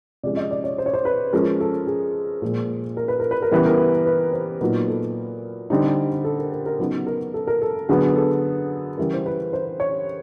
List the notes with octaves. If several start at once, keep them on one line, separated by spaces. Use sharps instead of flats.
C3 F3 G#3 C#4 D5
D#5
D5
C#5
C5
C#5
C5
B4
F3 G#3 C#4 A#4
A4
G#4
A#2 F3 G#3
A#4
B4
A#4
B4
A#4
C#3 E3 G3 B3 B4
A#4
B4
C5
A#2 F#3 B3 D#4 A#4
A4
D3 G3 C4 D#4
A4
A#4
A#4
A#4
C#3 F#3 B3 D#4 B4
A#4
A4
A#4
A4
D3 F#3 B3 G#4
A4
C#3 E3 G3 A#4
C5
B4
C5
C#5